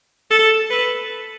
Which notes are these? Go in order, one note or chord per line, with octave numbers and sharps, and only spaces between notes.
A4
B4